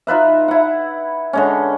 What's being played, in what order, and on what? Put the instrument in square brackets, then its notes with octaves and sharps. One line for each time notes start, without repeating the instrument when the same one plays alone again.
[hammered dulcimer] D#4 F4 B4 E5
E4 F#5
D3 G#3 C#4